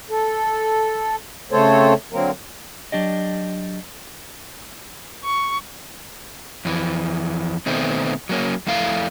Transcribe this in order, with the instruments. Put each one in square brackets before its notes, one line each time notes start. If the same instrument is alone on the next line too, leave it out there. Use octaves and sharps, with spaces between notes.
[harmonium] A4
C#3 A3 C4 A4 C5 C#5
D3 F#3 A#3 C4 A#4
[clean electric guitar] F#3 D4 G4 D#5
[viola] C#6
[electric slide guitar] F2 E3
B2 D#3 A3 B3 C4
F#3 A#3 C#4
F2 A3 E4 F5